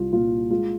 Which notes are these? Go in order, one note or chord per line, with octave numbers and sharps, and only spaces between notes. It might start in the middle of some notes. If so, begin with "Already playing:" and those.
Already playing: C2 F4
A#2 F4
G#3 F4